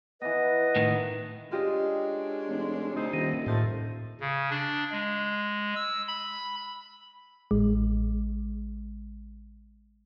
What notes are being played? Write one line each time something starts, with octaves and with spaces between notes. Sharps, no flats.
E3 B3 B4 D#5
A2 D#3
G#3 C#4 D4 F4 G4 D#5
F1
D2 B2 C4 D#4
D#1 D#3
A2 F3 A3
C#3
D4
G#3
E6
B5
A1 G#3